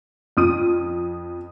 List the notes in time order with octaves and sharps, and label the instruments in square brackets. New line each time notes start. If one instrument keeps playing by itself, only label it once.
[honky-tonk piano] F2 D#6 D#7